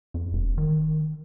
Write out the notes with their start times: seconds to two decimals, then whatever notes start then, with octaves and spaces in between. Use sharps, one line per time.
0.14 F2
0.33 E1
0.58 D#3